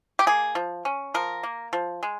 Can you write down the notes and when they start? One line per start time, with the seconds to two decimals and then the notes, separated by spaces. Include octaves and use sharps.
0.19 G4
0.27 A#3 G#4
0.55 F3
0.85 C#4
1.14 F3 A#4
1.43 A#3
1.73 F3
2.03 G#3